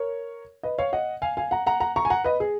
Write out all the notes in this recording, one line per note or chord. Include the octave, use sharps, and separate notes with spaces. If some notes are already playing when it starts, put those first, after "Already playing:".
Already playing: A#4 C#5
B4 D#5
C#5 F5
D#5 F#5
F5 G#5
F5 G#5
F#5 A#5
F#5 A#5
F#5 A#5
A#5 C#6
G#5
F#5 A#5
B4 D#5
G#4